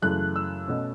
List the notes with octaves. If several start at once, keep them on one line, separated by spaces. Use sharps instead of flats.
F#2 C#3 E3 A3 F#6
E6
B2 A3 C#4